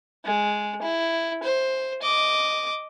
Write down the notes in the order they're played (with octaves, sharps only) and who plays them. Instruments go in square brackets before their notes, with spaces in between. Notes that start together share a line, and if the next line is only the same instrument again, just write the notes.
[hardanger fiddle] G#3
E4
C5
D#5 D6